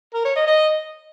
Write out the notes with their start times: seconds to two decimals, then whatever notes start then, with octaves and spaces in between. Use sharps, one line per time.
0.14 A#4
0.25 C#5
0.36 D#5
0.47 D#5